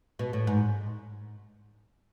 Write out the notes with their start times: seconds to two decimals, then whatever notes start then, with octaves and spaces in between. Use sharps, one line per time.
0.19 B2
0.33 A2
0.47 G#2